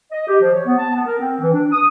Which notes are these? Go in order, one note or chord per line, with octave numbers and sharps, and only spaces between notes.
D#5
G4
F3
C#5
B3
A5
B3
A#4
C4
E3
D4
D#6